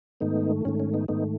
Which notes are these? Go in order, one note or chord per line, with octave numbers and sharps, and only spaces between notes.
G#2 D#3 A3 B3 D#4
G#2 D#3 A3 C#4
C#4
B3 D#4
G#2 D#3 A3 B3 D#4